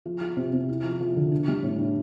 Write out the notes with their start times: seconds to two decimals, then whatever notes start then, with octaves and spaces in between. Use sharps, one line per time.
0.05 F3
0.21 F4
0.37 C3
0.53 C3
0.69 E4
0.84 F3
1.01 F3
1.16 D3
1.32 D4
1.48 G3
1.63 A2
1.78 D4